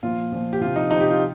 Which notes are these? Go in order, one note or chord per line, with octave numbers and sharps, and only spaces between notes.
A#2 F3 F4
A#2 F3
G4
C3 F3 F4
D#4
C3 F3 D#4
G4
F4